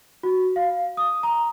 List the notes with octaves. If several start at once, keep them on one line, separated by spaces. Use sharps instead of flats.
F#4
F5
D#6
A#5